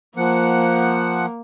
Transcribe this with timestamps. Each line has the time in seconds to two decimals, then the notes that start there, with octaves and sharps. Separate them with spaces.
0.17 F3 A#3 F#5